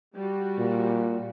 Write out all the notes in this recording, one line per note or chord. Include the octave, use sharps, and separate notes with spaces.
G3 F#4
A#2